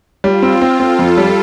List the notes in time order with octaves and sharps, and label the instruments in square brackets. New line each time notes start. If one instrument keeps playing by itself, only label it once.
[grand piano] G3 [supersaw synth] F4
[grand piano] C4
C4
[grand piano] C4 [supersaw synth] A4
[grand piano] F2
G3